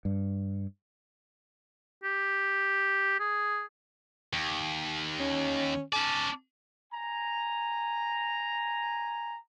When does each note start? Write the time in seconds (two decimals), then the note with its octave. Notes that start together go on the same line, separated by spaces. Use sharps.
0.05 G2
2.04 G4
3.20 G#4
4.33 D#2
5.19 C#4
5.93 C#4 D5 A5
6.93 G#5 A#5